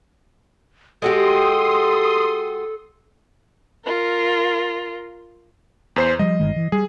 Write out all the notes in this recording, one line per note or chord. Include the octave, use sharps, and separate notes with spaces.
G#3 F#4 G4 A4 C6 D#6
F4 A#4
E2 C5 C7
F3 G3 D#5
G1 D#3 G#3
E3
G3 G#4